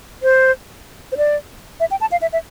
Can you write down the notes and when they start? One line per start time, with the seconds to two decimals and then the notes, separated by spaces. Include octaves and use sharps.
0.23 C5
1.12 C5
1.17 D5
1.80 E5
1.91 G5
2.01 A5
2.11 F5
2.22 E5
2.33 E5